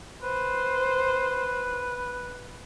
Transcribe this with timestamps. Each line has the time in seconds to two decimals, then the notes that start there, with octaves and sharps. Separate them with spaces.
0.22 B4 C5